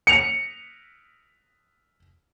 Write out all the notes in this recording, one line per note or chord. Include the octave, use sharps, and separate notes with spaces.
C#7 F7